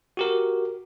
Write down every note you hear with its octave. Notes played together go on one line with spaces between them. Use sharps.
F#4 G4 A#4